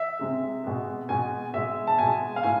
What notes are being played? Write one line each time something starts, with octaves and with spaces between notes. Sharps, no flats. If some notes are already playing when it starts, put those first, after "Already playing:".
Already playing: E5
C3 G#3
B2 G#3
B2 G#3 G#5
B2 G#3 E5
A5
B2 G#3 G#5
F5
A2 G#5